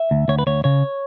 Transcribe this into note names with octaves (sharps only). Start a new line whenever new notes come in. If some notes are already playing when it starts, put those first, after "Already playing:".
Already playing: E5
D2
D2 C#5
B4
D2 C#5
C#3 C#5